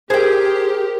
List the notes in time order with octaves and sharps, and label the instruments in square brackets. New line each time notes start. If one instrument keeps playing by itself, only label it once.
[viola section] G4 [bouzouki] G#4 G5 [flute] A#4 [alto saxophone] C5